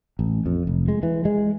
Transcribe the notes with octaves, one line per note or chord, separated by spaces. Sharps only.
A1
F2
F1
G#3
E3
G#3